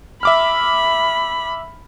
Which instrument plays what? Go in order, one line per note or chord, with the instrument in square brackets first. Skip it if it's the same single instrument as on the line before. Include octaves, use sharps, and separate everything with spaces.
[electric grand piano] E5 D6 F6 [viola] B5